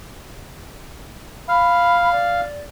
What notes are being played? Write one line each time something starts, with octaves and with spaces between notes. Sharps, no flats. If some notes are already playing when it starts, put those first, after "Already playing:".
F5 B5
D5